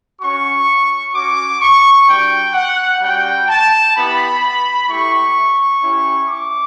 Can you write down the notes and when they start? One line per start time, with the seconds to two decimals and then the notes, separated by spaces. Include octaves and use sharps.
0.20 C#4 F#4 C#6
1.13 C#4 F#4 D6
1.60 C#6
2.08 G3 D4 F#4 G5
2.54 F#5
3.01 G3 C#4 F#4 G5
3.47 A5
3.95 B3 E4 G4 B5
4.88 A3 E4 G4 C#6
5.82 C#4 E4 G4
6.29 D6